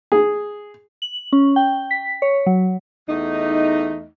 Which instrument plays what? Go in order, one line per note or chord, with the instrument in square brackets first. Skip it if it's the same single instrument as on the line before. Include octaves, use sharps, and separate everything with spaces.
[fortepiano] G#4
[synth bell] F#7
C#4
G5
B6
C#5
F#3
[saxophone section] E2 A3 D#4